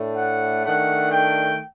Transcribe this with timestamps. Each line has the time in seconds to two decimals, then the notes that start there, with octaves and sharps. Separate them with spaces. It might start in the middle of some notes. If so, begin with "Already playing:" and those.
Already playing: A2 A3 D4
0.16 F#5
0.64 D#3 A3 D4 F#5
1.12 G5